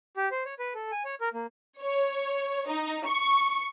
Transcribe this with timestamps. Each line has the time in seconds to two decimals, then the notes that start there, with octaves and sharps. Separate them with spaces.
0.17 G4
0.32 C5
0.46 C#5
0.59 B4
0.75 A4
0.91 G#5
1.05 C#5
1.21 A#4
1.34 A#3
1.81 C#5
2.67 D#4
3.06 C#6